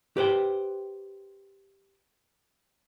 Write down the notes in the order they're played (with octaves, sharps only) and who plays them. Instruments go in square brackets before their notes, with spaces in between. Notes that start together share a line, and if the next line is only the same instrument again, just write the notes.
[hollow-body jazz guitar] G4 B4 C5 G5